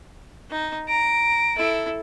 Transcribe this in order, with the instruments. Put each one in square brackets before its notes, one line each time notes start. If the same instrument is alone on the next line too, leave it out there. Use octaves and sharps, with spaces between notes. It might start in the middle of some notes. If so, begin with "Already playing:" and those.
[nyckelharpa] D#4
[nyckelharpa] A#5 [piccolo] D7
[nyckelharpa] E4 A4